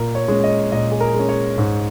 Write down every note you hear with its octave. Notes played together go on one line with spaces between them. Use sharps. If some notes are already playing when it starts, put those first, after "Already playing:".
Already playing: A#2 A#4
C#5
G#3 C#4
D#5
A#2 D#5
G#4
A#4
G#3 C#4
C#5
G#2